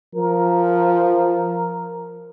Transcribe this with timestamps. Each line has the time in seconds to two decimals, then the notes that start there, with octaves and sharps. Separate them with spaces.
0.15 F3 A#4